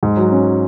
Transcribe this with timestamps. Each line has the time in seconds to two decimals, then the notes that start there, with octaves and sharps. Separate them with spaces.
0.03 G#2
0.17 F#3
0.32 C#4